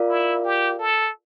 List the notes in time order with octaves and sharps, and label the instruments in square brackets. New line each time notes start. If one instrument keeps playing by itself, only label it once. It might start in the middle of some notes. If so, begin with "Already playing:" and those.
Already playing: [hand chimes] F4 A#4 D5 F5
[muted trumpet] E4
G4
A4